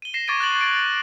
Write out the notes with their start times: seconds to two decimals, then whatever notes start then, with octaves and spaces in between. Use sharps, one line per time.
0.02 D#7 G7
0.14 A#6 C7 E7
0.28 C#6 D6 G#6 A6 D7 D#7
0.40 F#6 A6 F#7
0.61 F#6 A6 D7
0.79 D#7